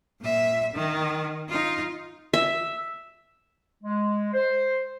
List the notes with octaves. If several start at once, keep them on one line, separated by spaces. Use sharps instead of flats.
A#2 E5
D#3
D#4 F4
E5
G#3
C5